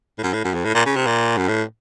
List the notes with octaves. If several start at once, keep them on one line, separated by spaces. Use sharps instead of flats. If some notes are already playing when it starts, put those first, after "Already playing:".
A2
F#2
A2
F#2
F2
A2
A#2
C#3
C3
A#2
F#2
A2